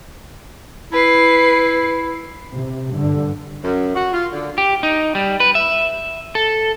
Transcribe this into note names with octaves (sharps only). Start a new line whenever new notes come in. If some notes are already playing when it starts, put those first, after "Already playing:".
E4 B4 C7
C3
G2 D3
F#2
F#4
F4
D3
G4
D#4
G3
B4
E5
A4